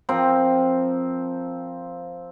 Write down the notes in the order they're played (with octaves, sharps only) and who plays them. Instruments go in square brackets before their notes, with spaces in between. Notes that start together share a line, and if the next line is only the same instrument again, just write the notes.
[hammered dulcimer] F3 C4 A#4 C5